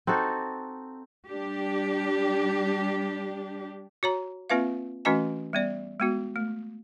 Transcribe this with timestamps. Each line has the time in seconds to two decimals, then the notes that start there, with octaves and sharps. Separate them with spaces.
0.07 C4 D#4 F#4 A4
1.29 G3 D4 G4
4.03 F#4 C#5 A#5
4.50 A#3 C4 F4 B4 E5 F5
5.05 E3 A3 C#4 F#4 D#5 G#5
5.53 G3 B3 D5
6.00 G#3 B3 F#4
6.36 A3